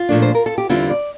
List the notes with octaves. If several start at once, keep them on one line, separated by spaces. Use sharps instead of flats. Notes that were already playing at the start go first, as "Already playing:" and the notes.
Already playing: F4
A#2 F3 A3 D4
C5
A#4
A4
G4
E2 D3 G3 C4 E4 F4
D5